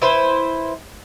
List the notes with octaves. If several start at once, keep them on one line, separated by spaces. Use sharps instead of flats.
E4 B4 C5